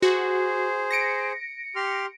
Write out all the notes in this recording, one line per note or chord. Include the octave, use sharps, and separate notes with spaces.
F#4 G#4 C5
A#6 C#7 D7
G4 C6 F6